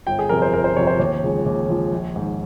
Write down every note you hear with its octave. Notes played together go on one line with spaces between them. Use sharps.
G1 G5
G#4
F2 C3 A#4
C5
G1 A#4
C5
F2 C3 C#5
C5
D#2 C#5
C#3 F3 G#3
D#2
C#3 F3 G#3
A#1
G#2 D#3